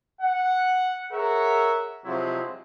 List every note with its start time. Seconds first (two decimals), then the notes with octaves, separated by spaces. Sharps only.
0.20 F#5
1.11 G#4 A#4 C#5 E5 F#5
2.03 C3 F3 F#3 G#3 E4